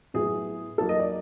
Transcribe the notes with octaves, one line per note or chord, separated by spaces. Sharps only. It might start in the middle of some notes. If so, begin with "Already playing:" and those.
A2 F#3 B3 G#4
F#3 A#3 D#4 A4
D#5
D5